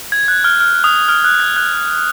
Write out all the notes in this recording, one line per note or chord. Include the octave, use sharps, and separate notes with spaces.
G#6
F#6
F6
F6
D#6
F6
F#6
G#6
F#6